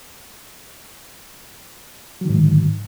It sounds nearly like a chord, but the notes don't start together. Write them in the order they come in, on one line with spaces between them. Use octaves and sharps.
F#3 D#3 G#2 D3